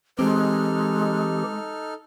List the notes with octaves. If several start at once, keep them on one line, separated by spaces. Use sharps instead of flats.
E3 G#3 C4 D#4 G4 A4 F6